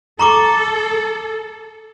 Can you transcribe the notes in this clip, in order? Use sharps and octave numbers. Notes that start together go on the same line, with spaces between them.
A4 A#5 C#6 D6